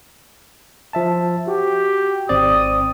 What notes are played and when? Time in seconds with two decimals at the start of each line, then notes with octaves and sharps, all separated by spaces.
0.93 F3 E5 A5
1.48 F#4 G4
2.29 G#1 C4 D5 D#6